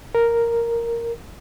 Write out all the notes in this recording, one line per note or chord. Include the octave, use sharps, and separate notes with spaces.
A#4